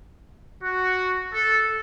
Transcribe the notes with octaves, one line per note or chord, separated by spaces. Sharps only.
F#4
A4